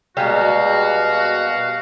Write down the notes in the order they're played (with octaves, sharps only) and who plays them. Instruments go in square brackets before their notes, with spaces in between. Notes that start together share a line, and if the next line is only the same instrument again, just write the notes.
[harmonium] B2 [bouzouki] G3 G#3 A#3 [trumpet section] F#4 [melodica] F5